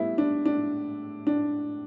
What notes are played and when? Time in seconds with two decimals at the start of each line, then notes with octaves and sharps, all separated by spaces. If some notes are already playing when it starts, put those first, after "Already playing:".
Already playing: A2 G3 B3 E4
0.18 D4
0.46 D4
1.27 D4